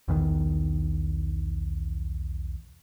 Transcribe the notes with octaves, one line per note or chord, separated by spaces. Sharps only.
B1 E2 D#3